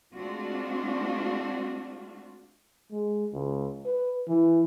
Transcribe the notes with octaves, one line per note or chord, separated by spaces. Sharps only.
G#3 A3 C4 D4 F4 F#4
G#3
C#2
B4
E3